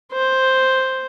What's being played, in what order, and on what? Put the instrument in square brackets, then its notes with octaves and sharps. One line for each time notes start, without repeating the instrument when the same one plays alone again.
[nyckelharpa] C5